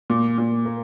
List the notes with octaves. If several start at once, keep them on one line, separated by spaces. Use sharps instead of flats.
A#2
A#2
A#3